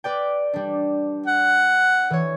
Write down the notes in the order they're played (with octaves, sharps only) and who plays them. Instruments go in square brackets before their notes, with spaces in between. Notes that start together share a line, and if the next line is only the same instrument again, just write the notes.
[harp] B4 D5 G5
G3 D4
[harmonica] F#5
[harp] E3 C#5